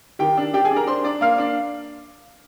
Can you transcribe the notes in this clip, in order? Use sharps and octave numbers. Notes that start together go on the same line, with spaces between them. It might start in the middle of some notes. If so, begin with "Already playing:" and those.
D#3 G4 G5
D4
D4 G4 G5
G#4 G#5
D4
A#4 A#5
D4 C5 C6
D4 D5 D6
A#3 F5 F6
D4